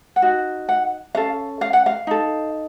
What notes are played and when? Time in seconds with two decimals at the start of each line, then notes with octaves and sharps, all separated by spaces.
0.16 F#5
0.22 D#4 F#4
0.69 F#5
1.15 C#4 A4 F5
1.61 F5
1.73 F#5
1.86 F5
2.07 D#4 A4